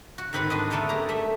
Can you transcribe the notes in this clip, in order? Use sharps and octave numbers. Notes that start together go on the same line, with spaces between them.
F#4
G#2 D#3 C4 B4 F#5 B5
D4 B4 D5 D#5
A3 B3 A4 A#4 D#5 G5
G4 G#4 D5 A#5
A3 A4 E5